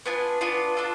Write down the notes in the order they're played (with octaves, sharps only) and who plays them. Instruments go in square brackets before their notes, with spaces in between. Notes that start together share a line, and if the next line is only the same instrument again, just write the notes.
[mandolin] B3 D4 F4 G#5
B3 D4 F4
D4 F4 A4